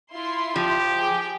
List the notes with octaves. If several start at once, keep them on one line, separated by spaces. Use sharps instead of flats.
E4 F4 C6
F3 G4
G#4 G5